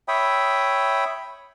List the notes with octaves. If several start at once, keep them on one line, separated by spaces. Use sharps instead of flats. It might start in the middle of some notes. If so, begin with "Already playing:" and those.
C#5 E5 G5 B5 D#6